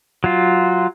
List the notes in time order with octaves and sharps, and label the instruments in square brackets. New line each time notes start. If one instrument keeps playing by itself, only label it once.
[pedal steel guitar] F#3 F4